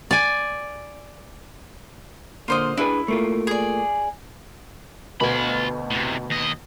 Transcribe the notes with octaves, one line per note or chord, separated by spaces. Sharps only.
D5 G#5
A#2 D3 F4 C5 D#5
D4 E4 G#4 B4
A3 A#3 F4
G#4 D5
D2 B2 B3 F4 B5
A2 C3
D#2 D#5